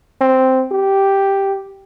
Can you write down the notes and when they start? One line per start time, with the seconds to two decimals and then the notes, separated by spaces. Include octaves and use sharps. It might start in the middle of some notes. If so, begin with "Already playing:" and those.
0.21 C4
0.71 G4